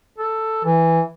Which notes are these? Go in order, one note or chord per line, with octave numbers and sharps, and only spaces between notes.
A4
E3